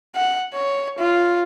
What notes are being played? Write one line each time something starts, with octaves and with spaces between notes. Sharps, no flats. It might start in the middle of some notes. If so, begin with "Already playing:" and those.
F#5
C#5
F4